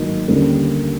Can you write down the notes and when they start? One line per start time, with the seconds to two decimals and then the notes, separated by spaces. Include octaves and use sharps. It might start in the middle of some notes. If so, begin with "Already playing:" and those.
Already playing: G#2 D#3 F#3 A#3 D#4
0.28 D#2 D3 G3 A#3 C#4